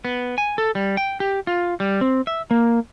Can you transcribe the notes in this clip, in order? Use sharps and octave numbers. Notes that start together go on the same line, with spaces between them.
B3
G#5
A4
G3
G5
G4
F4
G3
C4
E5
A#3